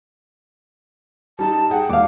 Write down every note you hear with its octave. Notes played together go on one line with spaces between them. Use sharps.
G3 D#4 A5
G#4 F#5 G5
E1 F5 D6